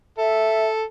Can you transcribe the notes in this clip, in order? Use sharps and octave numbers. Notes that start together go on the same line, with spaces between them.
A4 E5